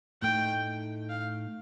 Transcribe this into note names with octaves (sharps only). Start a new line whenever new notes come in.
A2 A3 D#4 G5
F5